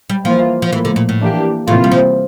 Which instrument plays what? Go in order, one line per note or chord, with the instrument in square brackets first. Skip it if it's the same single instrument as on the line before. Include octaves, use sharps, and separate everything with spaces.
[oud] G3
[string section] E3 A#3 F4 [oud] F3
[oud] F3
[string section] A2 F3 A#3 [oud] E3
[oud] D3
A#2
A2
[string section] E3 A#3 D4 G4
[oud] A2 [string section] C3 E3 A#3 F4
[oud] G3
F3